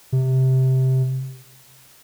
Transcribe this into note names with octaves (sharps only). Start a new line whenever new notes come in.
C3